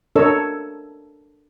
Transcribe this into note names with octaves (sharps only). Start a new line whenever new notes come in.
D4 A4 A#4 C#5 D#5 E6